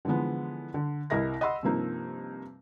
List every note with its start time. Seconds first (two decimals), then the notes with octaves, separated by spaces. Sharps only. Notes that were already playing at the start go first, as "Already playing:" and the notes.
0.05 D3 E3 F3 G#3 B3
0.74 D3
1.10 C2 E4 A#4 D#5 E5 A#6
1.41 D#5 F#5 B5 C6 E6
1.63 G2 C3 F3 A#3 D#4